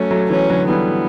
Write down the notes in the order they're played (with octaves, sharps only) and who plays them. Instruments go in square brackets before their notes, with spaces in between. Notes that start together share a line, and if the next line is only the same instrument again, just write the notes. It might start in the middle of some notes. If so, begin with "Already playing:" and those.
Already playing: [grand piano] F#3 A3 [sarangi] C#4
[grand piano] F#3 A3
[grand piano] E3 [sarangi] C#4
[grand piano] D3 F#3
[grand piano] E3 G3 [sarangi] B3